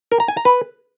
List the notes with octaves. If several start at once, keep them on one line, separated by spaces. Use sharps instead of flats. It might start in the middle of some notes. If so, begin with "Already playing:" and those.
A#4
A#5
G#5
A#5
B4